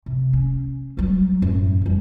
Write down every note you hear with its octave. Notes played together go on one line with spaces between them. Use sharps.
C3
C#4
F#3 G3
F#2 A2
F2 G3